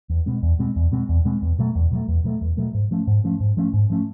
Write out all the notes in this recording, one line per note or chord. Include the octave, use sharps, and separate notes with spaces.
E2
B2 G#3 C4
E2
B2 G#3 C4
E2
B2 G#3 C4
E2
B2 G#3 C4
E2
B2 F#3 A3
E2
B2 F#3 A3
E2
B2 F#3 A3
E2
B2 F#3 A3
G#2
F3 A3 C#4
G#2
F3 A3 C#4
G#2
F3 A3 C#4
G#2
F3 A3 C#4